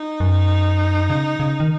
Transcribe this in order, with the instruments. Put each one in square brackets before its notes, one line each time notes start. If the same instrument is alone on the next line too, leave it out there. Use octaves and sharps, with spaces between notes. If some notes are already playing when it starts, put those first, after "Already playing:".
Already playing: [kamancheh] D#4
[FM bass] F#2
C#3
C#3
D#3